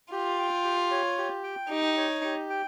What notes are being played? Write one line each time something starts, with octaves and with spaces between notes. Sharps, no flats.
F4 G4
G5
G4
C#5
G4
G5
D#4 G4
C#5
G4
G5